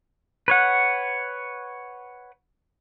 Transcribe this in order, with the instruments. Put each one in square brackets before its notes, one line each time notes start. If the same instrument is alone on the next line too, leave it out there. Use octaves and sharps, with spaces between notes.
[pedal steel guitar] B4 C#5 F#5